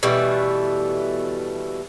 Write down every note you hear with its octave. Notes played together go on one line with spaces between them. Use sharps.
B2 E3 G3 A3